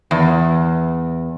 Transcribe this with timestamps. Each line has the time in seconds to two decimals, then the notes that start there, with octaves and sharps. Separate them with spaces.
0.11 E2